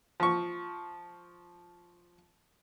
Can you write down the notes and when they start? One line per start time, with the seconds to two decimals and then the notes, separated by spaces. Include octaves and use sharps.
0.20 F3 C#6